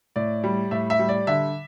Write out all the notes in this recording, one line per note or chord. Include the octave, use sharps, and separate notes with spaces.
A2 D5
G3
A2 E5
E5
G3
D5
D3 E5